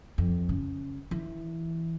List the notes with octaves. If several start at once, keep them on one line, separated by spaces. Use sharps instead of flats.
F2
C#3
E3